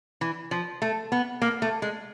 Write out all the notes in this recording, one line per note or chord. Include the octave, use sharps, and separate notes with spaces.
E3
F3
A3
B3
A#3
A3
G#3